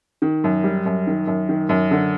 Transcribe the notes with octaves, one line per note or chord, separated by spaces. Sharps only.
D#3
F#2
G3
F#2
D#3
F#2
D#3
F#2
D3